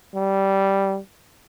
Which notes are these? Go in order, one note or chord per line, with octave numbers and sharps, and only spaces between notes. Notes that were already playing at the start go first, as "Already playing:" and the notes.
G3